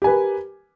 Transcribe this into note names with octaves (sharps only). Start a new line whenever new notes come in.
G4 A#4 B4 G#5